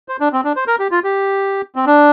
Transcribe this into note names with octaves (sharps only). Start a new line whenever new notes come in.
C5
D4
C4
D4
C5
A#4
G4
F4
G4
C4
D4